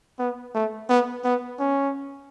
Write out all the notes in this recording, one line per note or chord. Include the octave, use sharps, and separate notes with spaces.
B3
A3
B3
B3
C#4